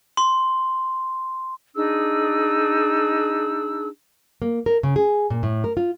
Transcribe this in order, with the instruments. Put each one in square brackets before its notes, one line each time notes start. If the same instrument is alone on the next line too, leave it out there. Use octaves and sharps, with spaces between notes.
[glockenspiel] C6
[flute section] D4 D#4 G#4 E6
[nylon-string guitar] A#3
A#4
C#3
G#4
A#2
A2
A#4
F4